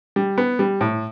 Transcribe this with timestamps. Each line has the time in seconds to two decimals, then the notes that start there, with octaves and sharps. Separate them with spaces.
0.16 G3
0.38 B3
0.59 G3
0.81 A2